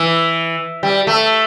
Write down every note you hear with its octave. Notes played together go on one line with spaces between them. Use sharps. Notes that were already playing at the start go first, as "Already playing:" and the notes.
Already playing: E3
G3
A3